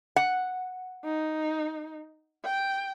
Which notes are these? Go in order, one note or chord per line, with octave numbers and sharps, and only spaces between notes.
F#5
D#4
G5